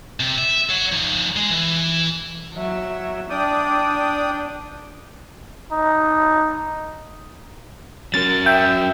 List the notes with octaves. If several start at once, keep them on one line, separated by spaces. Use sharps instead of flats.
C3
E5
C#5 F#5
F3 D#4
G#3
E3
F#3 E5
D4 D5 G5 D#6
D#4
F#3 C#4 A#4 A6
E5 G5